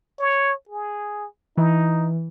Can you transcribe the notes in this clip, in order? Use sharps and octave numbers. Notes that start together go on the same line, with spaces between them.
C#5
G#4
E3 D#4